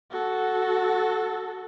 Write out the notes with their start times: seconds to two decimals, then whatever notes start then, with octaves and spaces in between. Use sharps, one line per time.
0.11 F#4 A4